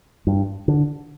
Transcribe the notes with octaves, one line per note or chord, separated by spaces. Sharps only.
G2
D3